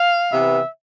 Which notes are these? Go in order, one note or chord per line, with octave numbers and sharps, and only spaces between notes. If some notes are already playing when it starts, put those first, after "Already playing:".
Already playing: F5
C3 E3 B3 E5